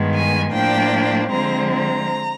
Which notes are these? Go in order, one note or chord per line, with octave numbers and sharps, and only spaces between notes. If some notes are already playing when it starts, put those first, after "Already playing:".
Already playing: G2 D#3 G#3 B3
G#5
A2 F3 A#3 D4 G5
D3 F3 G#3 C4 A#5
A#5